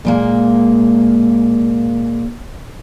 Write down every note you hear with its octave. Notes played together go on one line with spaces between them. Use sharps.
A#2 G#3 A#3